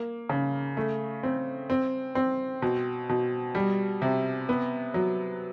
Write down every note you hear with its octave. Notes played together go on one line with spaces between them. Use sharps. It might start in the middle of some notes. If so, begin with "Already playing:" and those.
Already playing: A#3
C#3
A3
C4
C4
C4
B2
B2
G3
C3
B3
F#3